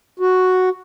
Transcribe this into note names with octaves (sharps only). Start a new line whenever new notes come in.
F#4